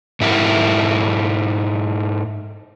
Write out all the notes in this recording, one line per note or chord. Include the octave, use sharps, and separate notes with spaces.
G#2 E4 G4 A#4 F#5